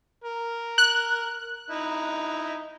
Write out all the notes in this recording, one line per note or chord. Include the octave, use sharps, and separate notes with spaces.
A#4
F#6
D#4 E4